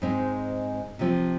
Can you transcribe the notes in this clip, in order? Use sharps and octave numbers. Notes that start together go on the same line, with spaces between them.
G#2 G#3 C4 D#4
C3 F3 C4